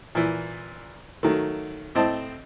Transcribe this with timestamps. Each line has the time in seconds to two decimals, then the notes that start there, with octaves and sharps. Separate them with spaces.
0.15 A#2 E3
1.23 D#3 F#3 A3
1.95 A2 C4 D#5 A5